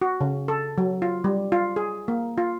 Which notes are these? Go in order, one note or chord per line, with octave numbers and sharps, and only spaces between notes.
F#4
C#3
A4
F#3
F4
G3
F4
G#4
A#3
F4